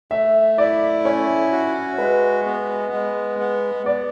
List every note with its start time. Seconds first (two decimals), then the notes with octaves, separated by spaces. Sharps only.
0.11 A3 E5
0.58 E4 D5
1.04 C#4 C#5
1.52 F#4
1.98 G#3 B4
2.46 B3
2.93 G#3
3.40 B3
3.86 B3 D5